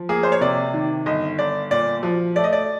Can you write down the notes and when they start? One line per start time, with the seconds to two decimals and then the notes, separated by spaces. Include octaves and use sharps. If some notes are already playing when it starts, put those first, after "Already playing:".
Already playing: F3
0.09 A#3 G#4
0.23 C5
0.32 C#5
0.41 C3 D5
0.74 D#3
1.06 G1 D#5
1.39 G1 D5
1.71 A#2 D5
2.03 F3
2.36 A3 D5
2.44 D#5
2.53 D5